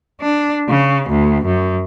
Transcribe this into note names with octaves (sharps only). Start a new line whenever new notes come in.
D4
C#3
D2
F#2